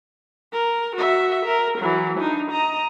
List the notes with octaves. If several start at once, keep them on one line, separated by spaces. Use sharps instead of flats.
A#4
F#4 E5
A#4
E3 F#3
D4 D#4
D#5 A#5